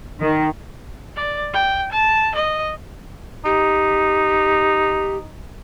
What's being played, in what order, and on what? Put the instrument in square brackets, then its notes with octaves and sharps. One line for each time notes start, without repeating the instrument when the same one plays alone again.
[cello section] D#3
[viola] D5
G5
A5
D#5
[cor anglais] D#4 [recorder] G4